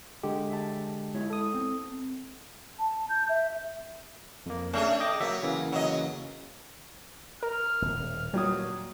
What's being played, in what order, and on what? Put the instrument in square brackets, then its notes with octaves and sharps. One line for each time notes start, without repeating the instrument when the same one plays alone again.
[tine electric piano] D3 G#3 G4
[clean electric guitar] E5 G5 A5
G#3 E4 C#5
[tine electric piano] A4 D#6
[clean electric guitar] C4
[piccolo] A5
G6
E5
[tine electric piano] F2 A#3
[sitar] A3 G#4 [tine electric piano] C#4 D4
[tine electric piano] D#5 G5 D6
[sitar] F#3 [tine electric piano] A#3 E5
[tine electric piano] C#3 E3 A#3
[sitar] F#3 D#5
[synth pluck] A#4 [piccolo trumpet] F6
[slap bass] D#1 A2
[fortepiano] D#2 F#3 D#6 [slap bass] A#2 [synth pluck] G3